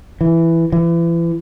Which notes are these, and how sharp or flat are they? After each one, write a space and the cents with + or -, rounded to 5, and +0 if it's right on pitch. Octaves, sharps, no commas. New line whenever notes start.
E3 +5
E3 +35